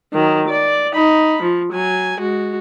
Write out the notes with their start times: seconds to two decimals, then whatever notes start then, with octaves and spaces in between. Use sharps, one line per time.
0.13 D#3 F#3
0.48 D5
0.94 D#4 B5
1.43 F3
1.73 F#3 G#5
2.19 G#3 F#4